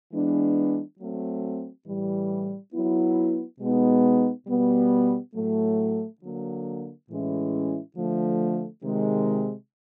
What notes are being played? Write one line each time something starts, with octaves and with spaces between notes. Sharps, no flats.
E3 G#3 B3 D4
F#3 A3 C4
A2 E3 G3
F#3 B3 E4
B2 G#3 B3 D#4
B2 G3 B3
A2 F#3 A3
D3 F#3 A#3
A2 E3 G#3 C#4 E4
D3 F3 A3
C3 D#3 G#3